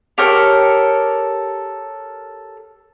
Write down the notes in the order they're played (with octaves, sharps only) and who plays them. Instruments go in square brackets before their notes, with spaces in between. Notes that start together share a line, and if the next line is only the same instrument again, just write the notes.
[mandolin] G4 A4 A#4 C#5